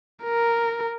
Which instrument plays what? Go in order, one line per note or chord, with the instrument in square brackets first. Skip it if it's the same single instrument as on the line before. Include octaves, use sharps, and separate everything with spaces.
[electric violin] A#4